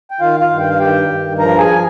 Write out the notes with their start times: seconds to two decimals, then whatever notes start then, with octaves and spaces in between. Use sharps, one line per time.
0.11 G5
0.20 D#3 F4 F5
0.40 F4 F5
0.50 G2
0.60 G5
0.70 F5
0.79 D#3 G4 G5
1.09 G2
1.39 F3 A#4 A#5
1.59 G#4 G#5